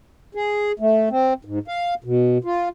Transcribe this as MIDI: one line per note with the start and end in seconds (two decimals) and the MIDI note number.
0.35 0.72 68
0.79 1.09 57
1.10 1.33 60
1.45 1.59 44
1.68 1.94 77
2.04 2.38 47
2.44 2.69 65